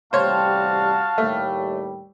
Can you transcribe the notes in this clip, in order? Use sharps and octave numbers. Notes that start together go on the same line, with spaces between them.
A1 C3 G3 F#4 C5 C#5 F5 A5
D#2 A2 G3 A3